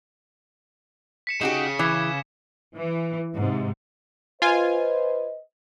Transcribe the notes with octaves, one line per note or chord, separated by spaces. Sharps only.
B6 C#7 E7
C#3 D#4 F#4 G4 E7
E3 D6 G#6
E3
G#2 C3
F4 B4 C5 D#5 G#5